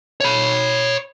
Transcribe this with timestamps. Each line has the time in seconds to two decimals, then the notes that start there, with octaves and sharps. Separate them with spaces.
0.21 C#5 B5